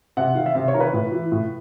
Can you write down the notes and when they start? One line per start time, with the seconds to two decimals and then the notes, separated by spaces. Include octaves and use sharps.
0.17 C3 F#5
0.35 D#3 F5
0.46 E5
0.55 C3 F5
0.68 C#5
0.74 D#3 A#4
0.81 B4
0.93 A2
1.12 E3
1.32 A2